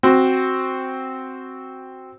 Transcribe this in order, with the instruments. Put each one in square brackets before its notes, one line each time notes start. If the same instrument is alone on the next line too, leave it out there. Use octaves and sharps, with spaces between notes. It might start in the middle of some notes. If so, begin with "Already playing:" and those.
[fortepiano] C4 F#4